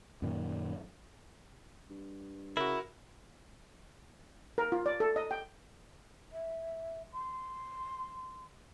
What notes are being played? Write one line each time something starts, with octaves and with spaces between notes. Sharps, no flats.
F#2 A#2 D#3
G2
C#3 E4 F#4 A#4
A#4
F4
D5
A4
D#5
G5
E5
C6